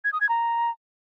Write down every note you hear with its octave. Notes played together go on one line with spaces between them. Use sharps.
G#6
D#6
G#6
A#5